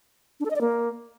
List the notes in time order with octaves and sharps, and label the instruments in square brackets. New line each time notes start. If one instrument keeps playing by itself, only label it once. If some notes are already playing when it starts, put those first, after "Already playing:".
[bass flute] D4
A4
D#5
D5
A#3